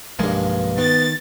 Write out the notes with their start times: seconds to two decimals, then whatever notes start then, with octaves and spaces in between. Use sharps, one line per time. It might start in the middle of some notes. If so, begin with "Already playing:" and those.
0.19 B1 G2 F3 G#3 A#3
0.78 D#3 B3 A6